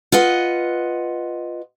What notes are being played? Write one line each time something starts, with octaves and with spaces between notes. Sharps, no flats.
F4 B4 D#5 F#5